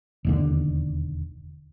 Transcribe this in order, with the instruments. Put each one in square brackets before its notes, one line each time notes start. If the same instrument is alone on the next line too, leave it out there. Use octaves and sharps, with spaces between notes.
[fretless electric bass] E1 D#2 D3